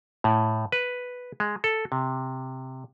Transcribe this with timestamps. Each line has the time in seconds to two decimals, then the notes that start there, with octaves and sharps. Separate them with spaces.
0.24 A2
0.72 B4
1.40 G#3
1.64 A4
1.92 C3